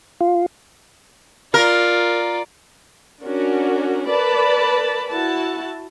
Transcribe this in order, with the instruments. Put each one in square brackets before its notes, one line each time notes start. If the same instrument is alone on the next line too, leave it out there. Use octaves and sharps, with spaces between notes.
[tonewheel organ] F4
[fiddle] F4 D5 [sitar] A#4
[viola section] C#4 D4 F#4 A#4
A#4 B4 D5 A5 B5
E4 F#4 A5